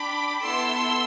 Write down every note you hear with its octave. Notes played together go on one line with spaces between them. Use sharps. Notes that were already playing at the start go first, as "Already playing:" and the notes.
Already playing: D4 G4 B5 D6
B3 E4 A4 C6 E6